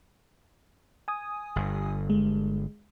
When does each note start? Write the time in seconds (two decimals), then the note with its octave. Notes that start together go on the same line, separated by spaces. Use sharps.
1.08 G#5 D#6
1.56 G1 G2
2.10 G#3